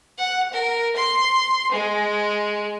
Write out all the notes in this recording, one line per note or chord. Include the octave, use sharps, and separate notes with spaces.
F#5
A#4
C6
G#3